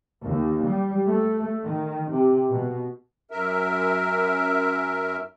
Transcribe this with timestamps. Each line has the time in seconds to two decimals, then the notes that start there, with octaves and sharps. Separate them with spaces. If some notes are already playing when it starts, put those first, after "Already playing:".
0.22 D#2
0.65 G3
1.06 A3
1.65 D#3
2.11 C3
2.51 B2
3.31 F#2 A#4 E5